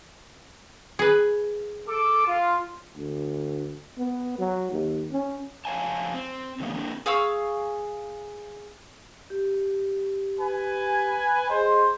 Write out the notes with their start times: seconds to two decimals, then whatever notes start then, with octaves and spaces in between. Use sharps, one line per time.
0.99 G#4 B4
1.88 A4 D6
2.27 F4
2.97 D2
3.98 B3
4.39 F#3
4.71 D#2
5.11 C#4
5.65 F2 C#5 F5 G#5 A5
6.14 C4
6.60 D3 D#3 F#3 A#3 B3
6.74 A#3 C4 D4 A#4
7.06 G#4 F5 C#6 E6
9.30 G4
10.40 B4 G#5
11.49 G#4 C5 D#5